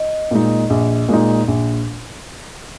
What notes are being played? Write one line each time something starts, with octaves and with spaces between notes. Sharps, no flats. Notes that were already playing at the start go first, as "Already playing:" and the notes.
Already playing: D#5
A#2 G#3 D#4
A#1
A#2 G#3 D#4
A#1